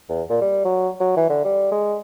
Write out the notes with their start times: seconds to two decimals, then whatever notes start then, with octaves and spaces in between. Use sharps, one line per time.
0.09 E2
0.30 A#2
0.41 G3
0.65 F#3
1.00 F#3
1.17 E3
1.30 D3
1.44 G3
1.72 G#3